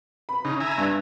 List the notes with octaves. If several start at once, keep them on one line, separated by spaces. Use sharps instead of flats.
B5
C#3 D#4
E5 G#5 A#5
G2